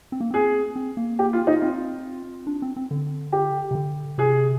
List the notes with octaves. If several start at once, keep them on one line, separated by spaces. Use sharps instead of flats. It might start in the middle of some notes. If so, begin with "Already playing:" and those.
C4
A#3
C4 G#4
C4
A#3
G4
F4
D#4
C4 F4
D4
C4
C4
D3
G4
C3
D3
C3 G#4